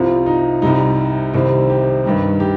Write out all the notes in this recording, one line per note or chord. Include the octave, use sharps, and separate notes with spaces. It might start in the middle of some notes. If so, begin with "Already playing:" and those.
Already playing: C2 C3 F3 F4
D#4
C2 C3 G3 D#4
C2 C3 D#3 G3 C4
G4
G2 D#3 G3 G4
G4